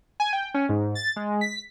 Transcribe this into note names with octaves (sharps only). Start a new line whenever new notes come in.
G#5
G5
C#4
G#2
A6
G#3
B6